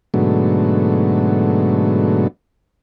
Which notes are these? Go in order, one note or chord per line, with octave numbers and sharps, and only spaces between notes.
G#2 B2 D3 F#3 A3